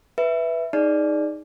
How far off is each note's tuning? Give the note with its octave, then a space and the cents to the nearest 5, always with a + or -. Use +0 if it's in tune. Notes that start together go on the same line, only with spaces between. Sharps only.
B4 +0 E5 +0
D#4 +0 G#4 +0 D5 +0